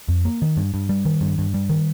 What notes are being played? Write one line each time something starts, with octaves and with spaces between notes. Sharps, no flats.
F2
A#3
D#3
G2
G2
G3
D#3
G2
G2
G3
D#3